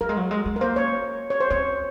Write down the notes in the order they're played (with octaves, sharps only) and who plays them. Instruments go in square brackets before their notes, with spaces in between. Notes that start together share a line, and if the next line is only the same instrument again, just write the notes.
[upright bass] F#3 [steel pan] A#4
[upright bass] G#3
F#3
G#3
G#3
[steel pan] A#4
[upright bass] A#3 [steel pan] C5
[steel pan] C#5
C#5
C5
[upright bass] C4 [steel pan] C#5